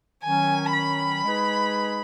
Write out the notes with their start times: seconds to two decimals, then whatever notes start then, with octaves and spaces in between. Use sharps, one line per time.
0.23 D#3 F#3 C#4 G#5
0.73 B5
1.22 G#3 D#4 G#4 B4